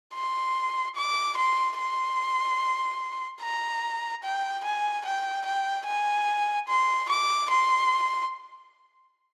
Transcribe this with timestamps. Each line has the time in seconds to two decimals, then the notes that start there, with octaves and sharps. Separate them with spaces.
0.15 C6
0.96 D6
1.38 C6
1.78 C6
3.42 A#5
4.23 G5
4.64 G#5
5.05 G5
5.46 G5
5.86 G#5
6.68 C6
7.09 D6
7.50 C6